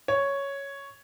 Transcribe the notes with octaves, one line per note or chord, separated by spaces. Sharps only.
C#5